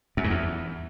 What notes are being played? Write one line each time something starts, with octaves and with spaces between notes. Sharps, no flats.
F#2
G#2
E2